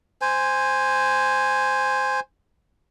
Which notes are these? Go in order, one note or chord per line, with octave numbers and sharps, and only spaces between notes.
C5 G#5